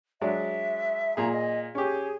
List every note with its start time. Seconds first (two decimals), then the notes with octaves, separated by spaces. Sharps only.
0.21 F#3 G#3 D4 E5
1.17 A#2 G#4 A#5
1.33 D#5
1.75 C#4 G4 G#4